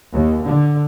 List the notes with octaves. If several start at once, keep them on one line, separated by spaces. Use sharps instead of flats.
D#2
D3